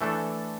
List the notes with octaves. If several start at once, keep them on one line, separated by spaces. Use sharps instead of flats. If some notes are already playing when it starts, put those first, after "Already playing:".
E3 A3 D4 A4